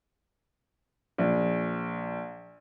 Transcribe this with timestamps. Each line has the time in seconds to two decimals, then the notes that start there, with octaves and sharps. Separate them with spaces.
1.18 A#1